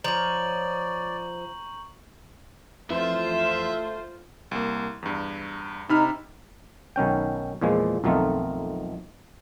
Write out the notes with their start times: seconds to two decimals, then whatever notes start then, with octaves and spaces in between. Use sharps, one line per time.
0.04 F3 C#5 D5 A#5 C#6 G6 F#7
2.90 F2 E3 A3 F4 C5 E5
4.51 C2 A#3
5.02 E2 G2
5.89 C3 D#4 B5 F6
6.96 B1 D#3 C#4 G5
7.61 E2 A#2 F3 G#3
8.04 B1 F2 D#3 A3 D#4 F4